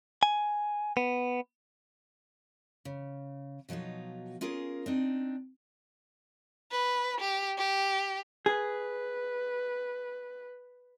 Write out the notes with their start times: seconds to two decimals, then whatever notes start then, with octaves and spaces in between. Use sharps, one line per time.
0.23 G#5
0.97 B3
2.85 C#3
3.69 B2 F3 F#3 D#4 F4
4.41 C#4 F4 G#4 A#4
4.86 C4 D4 D#4
6.71 B4
7.21 G4
7.58 G4
8.46 G#4 B4